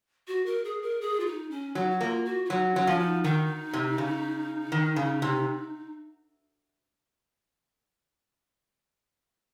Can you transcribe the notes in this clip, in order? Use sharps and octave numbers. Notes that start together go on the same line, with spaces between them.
F#4
A#4
G#4
A#4
G#4
F4
D#4
C#4
F#3 D#4
F#4
A#3 F4
F#4
F4
F#3 D#4
F#3 C#4
F3 C#4
D#4
D#3 D#4
C3
C#3
D#3
C#3
C3